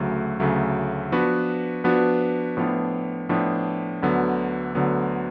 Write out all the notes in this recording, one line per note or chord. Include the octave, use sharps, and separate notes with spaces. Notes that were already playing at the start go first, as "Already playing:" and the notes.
Already playing: D2 C#3 F#3 A3
D2 C#3 F#3 A3
F3 B3 D4 F#4 B4
F3 B3 D4 F#4 B4
A2 F3 B3 D4
A2 F3 B3 D4
D2 D3 F#3 B3
D2 D3 F#3 B3